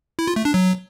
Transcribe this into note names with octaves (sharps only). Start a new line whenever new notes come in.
E4
F4
A3
D4
F#3